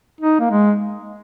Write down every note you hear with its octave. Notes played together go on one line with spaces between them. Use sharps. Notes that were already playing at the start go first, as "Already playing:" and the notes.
D#4
A#3
G#3